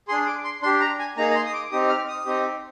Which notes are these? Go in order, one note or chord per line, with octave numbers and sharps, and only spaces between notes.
D4 G#4 C6
D6
C6
D4 G4 C6
A#5
G#5
A#3 D#4 G#4 A#5
A#5
C6
D#6
D6
C4 D#4 G4 D#6
F6
D#6
C4 D#4 G4